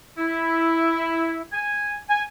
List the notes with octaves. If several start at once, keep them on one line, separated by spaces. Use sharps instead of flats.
E4
G#5
G#5